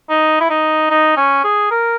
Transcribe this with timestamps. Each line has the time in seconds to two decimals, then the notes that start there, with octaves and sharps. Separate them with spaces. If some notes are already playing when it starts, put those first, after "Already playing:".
0.10 D#4
0.41 E4
0.50 D#4
0.90 D#4
1.17 C#4
1.44 G#4
1.71 A#4